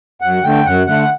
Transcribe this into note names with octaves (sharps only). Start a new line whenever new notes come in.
F#2 F#5
D3 A3 G5
F#2 F#5
D3 A3 F#5